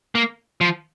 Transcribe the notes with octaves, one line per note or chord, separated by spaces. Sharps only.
A#3
F3